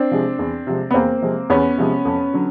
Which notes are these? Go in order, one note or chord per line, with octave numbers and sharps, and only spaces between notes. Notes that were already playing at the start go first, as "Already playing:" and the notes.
Already playing: C4 D4
C3 F3 G#3
E2
C3 F3 G#3
B3
E2 A#3 C4
C3 F3 G#3
E2 B3 C#4
C3 F3 G#3
F2
D3 F#3